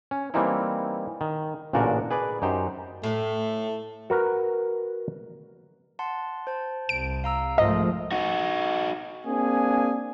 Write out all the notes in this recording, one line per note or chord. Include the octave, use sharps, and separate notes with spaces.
C#4
E3 G3 A#3 C4 D#4 E4
D#3
A1 A#2 C#3 D4 F#4 A#4
G#4 B4 D5
F#2 D#4 G4 C5
A2 A3
F#4 A#4 B4
F#5 A5 C6
C5 A5
C2 D7
F5 A#5 E6
G#2 F3 A3 A#4 D#5 D#6
D#4 F#4
A#3 C4 D4 G#4 G#5